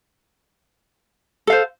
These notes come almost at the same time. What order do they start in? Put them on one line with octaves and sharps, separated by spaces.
A4 F5 C5